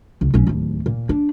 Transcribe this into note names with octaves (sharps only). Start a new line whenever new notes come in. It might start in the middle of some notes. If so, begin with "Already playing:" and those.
C#2
B1 C#4
D1 D#2
A#2
D4